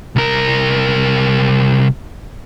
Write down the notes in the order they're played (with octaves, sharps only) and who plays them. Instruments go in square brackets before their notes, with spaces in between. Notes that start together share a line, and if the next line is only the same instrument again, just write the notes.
[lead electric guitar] C2 A#4